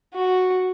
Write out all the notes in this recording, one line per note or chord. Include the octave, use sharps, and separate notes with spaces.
F#4